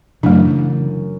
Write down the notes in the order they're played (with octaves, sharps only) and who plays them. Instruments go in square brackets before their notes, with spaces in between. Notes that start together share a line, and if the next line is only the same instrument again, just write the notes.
[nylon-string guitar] F#2 [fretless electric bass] C#3 E3 [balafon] A3 D4